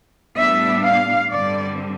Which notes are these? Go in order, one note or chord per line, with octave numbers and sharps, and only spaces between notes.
A2 G3 B3 D4 E5
F5
G2 D3 G3 C4 D5